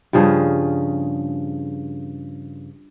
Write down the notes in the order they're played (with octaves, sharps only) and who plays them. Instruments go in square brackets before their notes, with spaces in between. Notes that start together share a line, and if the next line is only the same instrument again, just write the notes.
[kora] G2 C#3 F3 G#4